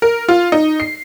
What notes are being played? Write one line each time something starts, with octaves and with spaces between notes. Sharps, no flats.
A#4
F4
D#4
C7